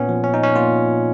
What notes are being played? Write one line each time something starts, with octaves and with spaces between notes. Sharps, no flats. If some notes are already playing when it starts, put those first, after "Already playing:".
Already playing: A#2 B3 C#4
F3
C#4
D#4
C#4
A#2 F4